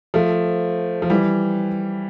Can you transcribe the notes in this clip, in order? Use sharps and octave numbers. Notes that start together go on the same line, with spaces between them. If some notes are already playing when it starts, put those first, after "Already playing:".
F3 A3
F3
E3 G3